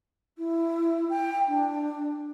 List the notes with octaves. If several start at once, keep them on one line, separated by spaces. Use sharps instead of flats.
E4
G5
D4